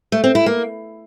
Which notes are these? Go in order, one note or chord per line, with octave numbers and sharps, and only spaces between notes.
A3
C4
E4
A#3